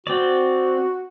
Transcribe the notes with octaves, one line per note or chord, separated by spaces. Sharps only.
C4 F#4 D5